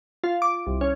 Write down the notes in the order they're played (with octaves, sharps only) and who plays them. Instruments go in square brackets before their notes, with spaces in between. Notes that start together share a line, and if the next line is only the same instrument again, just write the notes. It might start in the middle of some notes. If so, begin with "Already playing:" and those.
[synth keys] F4
D6
C2
C#4